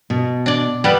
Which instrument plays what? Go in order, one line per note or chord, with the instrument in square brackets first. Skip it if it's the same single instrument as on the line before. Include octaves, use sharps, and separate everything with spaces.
[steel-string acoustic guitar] B2
[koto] D4 D5
[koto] G3 B3 B4 [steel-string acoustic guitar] D5